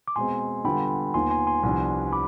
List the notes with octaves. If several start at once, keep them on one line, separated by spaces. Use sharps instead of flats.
D6
B2 G#3 C4 G#5 C6
D3 G3 B3 F4 G5 B5
D#2 D#3 B3 F4 G#5 C6
G#5 C6
G#5 C6
C2 C3 F3 B3 D4
B5 D6